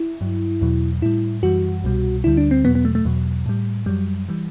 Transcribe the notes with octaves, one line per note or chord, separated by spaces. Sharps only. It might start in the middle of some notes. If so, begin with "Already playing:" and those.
Already playing: E4
G2 F#3
E2 B2 F#3
A2 G3 E4
F#2 E3 G3 F#4
C2 B2 G3
D2 D3 G3 E4
D4
C4
E2 B2 F#3 B3
B3
A3
A3
E2 B2 F#3
A2 G3
F#2 F#3 G3
E3 G3